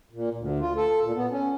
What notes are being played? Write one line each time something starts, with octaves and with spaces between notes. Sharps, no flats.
A#2
D2
F4
A4
A#2
B3
C#4